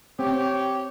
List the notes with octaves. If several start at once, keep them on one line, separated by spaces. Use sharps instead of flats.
C4 G4 C#5